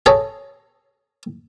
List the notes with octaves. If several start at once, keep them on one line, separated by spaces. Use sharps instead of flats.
G#4 A4 C#5 A#5